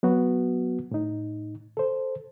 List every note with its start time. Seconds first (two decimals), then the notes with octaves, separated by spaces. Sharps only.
0.03 F#3 B3 F#4
0.91 A2 D#4
1.77 A4 C5